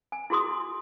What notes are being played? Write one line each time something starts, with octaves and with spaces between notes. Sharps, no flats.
G#5
E4 F#4 G#4 C6 D#6